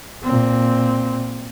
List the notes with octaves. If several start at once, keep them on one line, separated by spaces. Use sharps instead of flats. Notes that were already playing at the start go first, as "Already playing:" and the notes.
A#2 C4